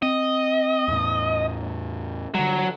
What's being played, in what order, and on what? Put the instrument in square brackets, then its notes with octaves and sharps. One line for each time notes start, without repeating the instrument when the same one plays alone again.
[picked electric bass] C4 [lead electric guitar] D#5
[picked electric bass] E2 A2
[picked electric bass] D3 G3 [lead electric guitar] F#3